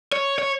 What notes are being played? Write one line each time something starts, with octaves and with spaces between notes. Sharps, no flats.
C#5
C#5